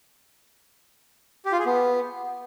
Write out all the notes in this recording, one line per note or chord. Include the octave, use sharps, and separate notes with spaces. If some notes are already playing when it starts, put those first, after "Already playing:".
G4
F4
G#4
B3